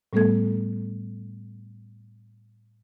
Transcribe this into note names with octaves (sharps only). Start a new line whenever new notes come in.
A2 G3 A3 B3 A4 G#6